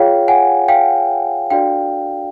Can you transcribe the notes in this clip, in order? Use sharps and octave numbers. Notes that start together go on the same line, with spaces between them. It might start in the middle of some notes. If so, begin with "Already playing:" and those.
Already playing: F4 G#4 C#5 F5 G5
F#5 G#5
F5 G5
D4 F#4 A4 D5 F5 G5